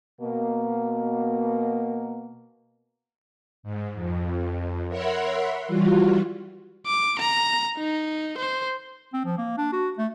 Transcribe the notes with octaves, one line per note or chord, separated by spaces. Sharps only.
B2 A#3
G#2
F2
A#4 C#5 E5 F#5 B5 C6
E3 G3 F4 F#4
D6
A#5
D#4
C5
C4
F3
A#3
D4
F#4
A3